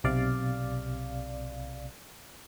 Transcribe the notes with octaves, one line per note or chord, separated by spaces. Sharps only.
B1 C3 D5 F5